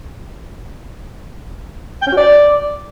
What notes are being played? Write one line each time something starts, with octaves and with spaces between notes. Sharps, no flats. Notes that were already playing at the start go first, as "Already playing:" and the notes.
G5
C#4
F#4
D5